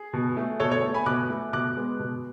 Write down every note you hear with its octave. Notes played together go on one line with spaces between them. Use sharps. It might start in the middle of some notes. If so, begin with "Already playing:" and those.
Already playing: G#4
B2
A3
B2 A4 C#5
A4 C#5
A3
G#5 B5
B2 D6 F#6
A3
B2 D6 F#6
G#3 B3
B2